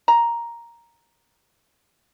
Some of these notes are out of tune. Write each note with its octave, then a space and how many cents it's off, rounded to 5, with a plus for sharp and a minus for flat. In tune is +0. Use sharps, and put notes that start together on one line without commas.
A#5 +5